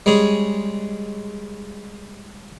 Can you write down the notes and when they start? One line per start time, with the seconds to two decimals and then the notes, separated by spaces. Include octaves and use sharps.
0.06 G3 G#3 C#4 G#4